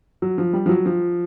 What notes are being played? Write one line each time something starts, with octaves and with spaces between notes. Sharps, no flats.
F#3
F3
G3
F3
F#3
F3